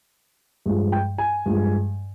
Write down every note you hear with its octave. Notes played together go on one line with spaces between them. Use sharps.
G2 F3 G#3
G5
G#5
G2 F3 G#3